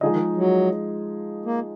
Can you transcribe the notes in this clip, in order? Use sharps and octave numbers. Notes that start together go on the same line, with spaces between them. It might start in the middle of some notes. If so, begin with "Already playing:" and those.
D3 F3 G#3 D#4 G#4 D#5
D#3
F#3
A#3